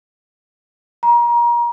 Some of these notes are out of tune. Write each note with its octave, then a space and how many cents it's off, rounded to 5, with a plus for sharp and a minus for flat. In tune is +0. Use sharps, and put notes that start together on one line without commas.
A#5 +30